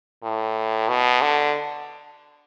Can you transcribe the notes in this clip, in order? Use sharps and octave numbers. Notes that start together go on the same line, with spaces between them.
A2
B2
D3